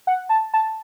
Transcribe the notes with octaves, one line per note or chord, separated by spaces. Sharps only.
F#5
A5
A5